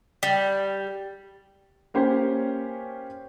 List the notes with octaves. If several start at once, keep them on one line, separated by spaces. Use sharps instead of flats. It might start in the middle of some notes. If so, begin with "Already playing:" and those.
G3
A#3 C#4 G4 C5